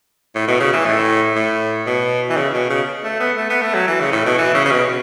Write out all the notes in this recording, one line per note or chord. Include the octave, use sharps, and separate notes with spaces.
A2
B2
C#3
E3
A2
A2
B2
E3
C#3
B2
C#3
A3
B3
A3
B3
A3
F#3
E3
C#3
A2
B2
E3
C#3
C#3
B2